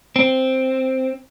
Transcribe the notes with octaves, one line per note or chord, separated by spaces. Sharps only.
C4